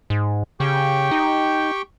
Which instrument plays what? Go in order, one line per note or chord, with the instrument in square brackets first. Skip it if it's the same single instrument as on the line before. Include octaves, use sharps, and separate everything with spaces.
[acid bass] G#2
[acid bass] C#3 [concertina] G4 G5 C#6
[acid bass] D#4